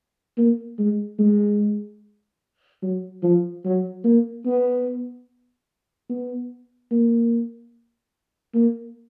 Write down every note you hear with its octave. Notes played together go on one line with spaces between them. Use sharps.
A#3
G#3
G#3
F#3
F3
F#3
A#3
B3
B3
A#3
A#3